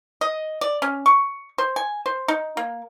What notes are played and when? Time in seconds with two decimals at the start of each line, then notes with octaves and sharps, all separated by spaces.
0.21 D#5
0.61 D5
0.82 C#4
1.06 C#6
1.58 C5
1.76 G#5
2.06 C5
2.28 D#4
2.57 A#3